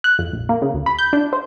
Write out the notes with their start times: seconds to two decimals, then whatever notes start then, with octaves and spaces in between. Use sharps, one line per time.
0.04 F#6
0.19 F2
0.33 A#1
0.49 A#3
0.62 C#3
0.74 D2
0.86 B5
0.99 G6
1.13 D4
1.33 C5